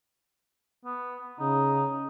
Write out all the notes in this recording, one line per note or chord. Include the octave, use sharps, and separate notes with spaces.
B3
C#3 D#4